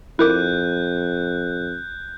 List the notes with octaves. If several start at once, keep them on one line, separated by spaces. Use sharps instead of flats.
F2 E4 A#4 D6 F#6 G6